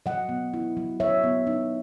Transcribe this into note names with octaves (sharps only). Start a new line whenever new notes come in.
F#3 D#5 F#5
B3
E4
F#3
F#3 C#5 E5
B3
D#4